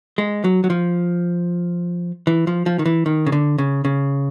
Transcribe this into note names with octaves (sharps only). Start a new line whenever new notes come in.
G#3
F#3
F#3
F3
E3
F3
F3
D#3
E3
D#3
C#3
D3
C#3
C#3